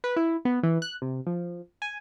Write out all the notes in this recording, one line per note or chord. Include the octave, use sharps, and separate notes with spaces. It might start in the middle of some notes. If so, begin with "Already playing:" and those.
B4
E4
B3
E3
F#6
C3
F3
G#5